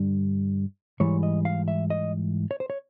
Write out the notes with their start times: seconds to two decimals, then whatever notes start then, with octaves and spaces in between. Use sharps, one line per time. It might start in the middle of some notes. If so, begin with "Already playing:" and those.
Already playing: G2 D3 G3
1.00 G#2 E3 G3 C#5
1.23 D#5
1.45 F5
1.68 E5
1.90 D#5
2.51 C#5
2.60 C5
2.70 C#5